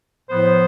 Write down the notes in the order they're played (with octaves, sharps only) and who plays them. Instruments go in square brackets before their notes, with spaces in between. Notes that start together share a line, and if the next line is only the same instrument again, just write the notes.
[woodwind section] A2 F3 B3 C5